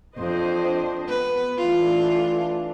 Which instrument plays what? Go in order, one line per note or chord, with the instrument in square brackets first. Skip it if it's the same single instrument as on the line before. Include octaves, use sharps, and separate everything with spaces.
[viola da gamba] F2 [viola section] D4 C5 D#5
[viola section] B3 [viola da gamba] B4
[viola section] E3 A3 D4 [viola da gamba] F4